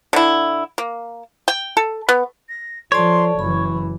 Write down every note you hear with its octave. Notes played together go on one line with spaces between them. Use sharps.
D3 E4
A#3
G5
A4
B3
A#6
F3 A4 C#5 D5 A5 C6
F#1 E3 B5 C#6